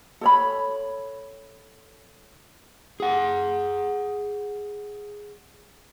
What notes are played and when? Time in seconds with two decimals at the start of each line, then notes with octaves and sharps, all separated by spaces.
0.21 A4 C#5 B5
3.00 G#4 F#5